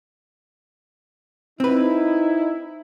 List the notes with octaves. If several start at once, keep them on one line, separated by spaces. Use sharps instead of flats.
C4 D#4 E4 B4